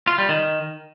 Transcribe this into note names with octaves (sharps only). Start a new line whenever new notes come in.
F4
G3
D#3